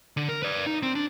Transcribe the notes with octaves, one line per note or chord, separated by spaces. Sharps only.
D3
A#4
B4 D5
D#4
C4
D4